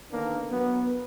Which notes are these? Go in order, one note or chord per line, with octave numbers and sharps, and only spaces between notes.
D3 D#3 A#3 B3 D4
F#3 B3